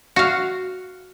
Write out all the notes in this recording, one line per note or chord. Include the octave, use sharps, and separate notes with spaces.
F#4 F5